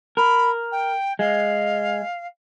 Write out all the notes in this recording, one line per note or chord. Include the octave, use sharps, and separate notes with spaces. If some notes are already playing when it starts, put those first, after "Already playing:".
A#4 B5
G5
G#3 F5